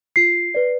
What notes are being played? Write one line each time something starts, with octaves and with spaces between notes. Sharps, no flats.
F4 C7
B4 D5